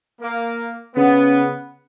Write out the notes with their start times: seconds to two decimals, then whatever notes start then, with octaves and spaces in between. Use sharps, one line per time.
0.20 A#3
0.95 C#3 B3